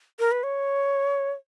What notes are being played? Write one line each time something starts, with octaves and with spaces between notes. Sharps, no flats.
A#4
B4
C#5